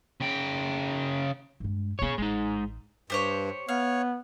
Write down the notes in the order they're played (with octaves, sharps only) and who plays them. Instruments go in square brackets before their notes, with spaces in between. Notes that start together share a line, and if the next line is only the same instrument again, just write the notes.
[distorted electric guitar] C#3 G5
[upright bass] G2 G#3
[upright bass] B2 B3 [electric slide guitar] G#4 C#5
[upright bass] A1 [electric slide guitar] G#3 D#4
[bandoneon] G2 [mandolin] G4 C5 C#5
[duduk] B3 [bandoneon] C#5 [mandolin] F5